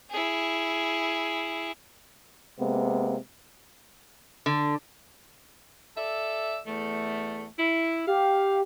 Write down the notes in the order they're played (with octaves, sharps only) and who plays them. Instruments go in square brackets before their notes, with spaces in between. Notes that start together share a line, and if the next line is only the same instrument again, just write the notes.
[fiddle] E4 G#4
[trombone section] C3 G#3 A#3 B3
[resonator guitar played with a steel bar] D3
[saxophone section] A4 D5 E5
E2 A3
E4
[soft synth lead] G4 [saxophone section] F5